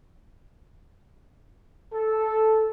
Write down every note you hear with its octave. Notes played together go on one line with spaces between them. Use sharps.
A4